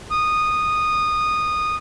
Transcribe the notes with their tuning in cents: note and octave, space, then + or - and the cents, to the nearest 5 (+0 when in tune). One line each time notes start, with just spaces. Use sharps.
D#6 -15